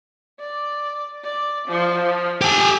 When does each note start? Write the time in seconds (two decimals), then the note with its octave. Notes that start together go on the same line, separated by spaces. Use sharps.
0.40 D5
1.24 D5
1.68 F3
2.41 G4 A4 G#5